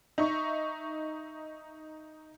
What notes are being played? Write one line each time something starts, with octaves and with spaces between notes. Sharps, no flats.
D#4 E5 C#6